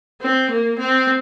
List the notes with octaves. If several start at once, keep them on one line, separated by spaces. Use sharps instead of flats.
C4
A#3
C4